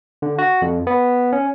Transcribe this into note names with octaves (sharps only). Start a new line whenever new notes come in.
D3
F#4
F2
B3
C#4